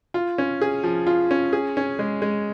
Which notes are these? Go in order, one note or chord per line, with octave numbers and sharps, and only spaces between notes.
F4
C#4
G#4
F3
F4
C#4
G#4
C#4
G#3
G#3